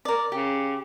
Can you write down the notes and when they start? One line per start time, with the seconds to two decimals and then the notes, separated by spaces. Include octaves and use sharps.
0.05 A#4 D5
0.32 C#3 G4